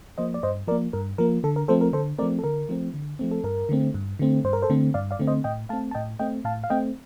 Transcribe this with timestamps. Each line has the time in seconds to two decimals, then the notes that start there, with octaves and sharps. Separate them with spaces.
0.18 F3 A#3 C5 D#5
0.34 D5
0.43 G2 C5 D#5
0.67 F3 A#4 D5
0.71 A#3
0.93 G2 A#4
1.18 F3 A#3 A#4
1.44 D3 A4
1.56 A#4
1.68 F3 A3 C4 A4 C5
1.81 A#4
1.93 D3 A4 C5
2.18 F3 A3 C4 A#4 D5
2.39 A4
2.44 D3 A#4
2.69 F3 A3 C4
2.94 D3
3.19 F3 A3 C4
3.31 A4
3.44 G2 A#4
3.69 D3 A3 C4
3.94 G2
4.19 D3 A3 C4
4.44 G2 C5
4.53 A#4
4.62 A4 C5
4.70 D3 A3 C4
4.94 G2 D5 F5
5.11 D5 F5
5.19 D3 A3 C4
5.27 C5 D#5
5.44 A2 D#5 G5
5.69 A3 F5 A5
5.73 C4
5.91 A5
5.95 A2 D#5 G5
6.19 A3 C4 D#5 G5
6.44 A2 F5 A5
6.64 F5
6.70 A3 C4 D#5 G5